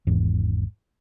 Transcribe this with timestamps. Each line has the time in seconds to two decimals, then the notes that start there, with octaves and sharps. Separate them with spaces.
0.07 G#1 E2 G#2 E3